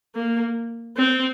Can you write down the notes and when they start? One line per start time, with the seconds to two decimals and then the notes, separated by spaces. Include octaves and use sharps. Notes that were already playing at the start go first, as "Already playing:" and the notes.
0.15 A#3
0.97 C4